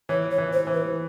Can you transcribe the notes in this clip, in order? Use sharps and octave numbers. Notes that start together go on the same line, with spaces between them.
E3 C#5
C#5
E3
C5
E3
B4